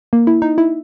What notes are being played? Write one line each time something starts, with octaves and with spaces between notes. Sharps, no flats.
A#3
E4
D#4
E4